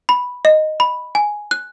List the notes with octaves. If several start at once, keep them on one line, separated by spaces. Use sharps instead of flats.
B5
D#5
B5
G#5
F#6